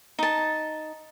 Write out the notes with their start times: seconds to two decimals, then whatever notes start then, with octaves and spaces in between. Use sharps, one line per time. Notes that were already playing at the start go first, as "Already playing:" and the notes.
0.19 D#4 A5